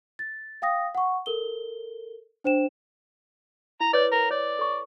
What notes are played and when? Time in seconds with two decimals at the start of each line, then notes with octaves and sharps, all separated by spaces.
0.19 A6
0.62 F5 G5 D#6 A#6
0.95 F#5 C#6
1.26 A4 A#4 G7
2.44 D4 C5 G5 E7
3.80 E4 A#5
3.93 B4 C#5 D5
4.11 A#4
4.31 C#5 D5
4.59 A4 C#6